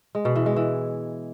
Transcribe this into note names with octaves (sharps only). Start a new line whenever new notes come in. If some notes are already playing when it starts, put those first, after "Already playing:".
G#3
B2
E3
G#3
E3